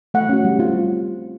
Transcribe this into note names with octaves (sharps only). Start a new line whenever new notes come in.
A3 F#5
C#4 F#4
G3
C4 F4